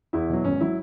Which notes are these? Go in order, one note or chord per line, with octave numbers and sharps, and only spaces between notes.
E2 E4
B2 F#3
G#1 C#4
F#3 E4